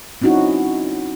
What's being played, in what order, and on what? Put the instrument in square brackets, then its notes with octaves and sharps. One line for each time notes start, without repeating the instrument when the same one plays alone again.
[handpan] C4 C#4 D#4 E4 F#4